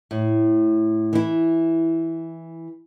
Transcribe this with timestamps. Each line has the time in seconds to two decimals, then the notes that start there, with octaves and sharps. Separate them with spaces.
0.11 A2
1.13 E3 E4